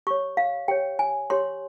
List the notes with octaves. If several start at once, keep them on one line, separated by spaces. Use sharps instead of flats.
G4 C#5 C#6
F5
G4 C#5 G5
G#5
G4 C#5 C6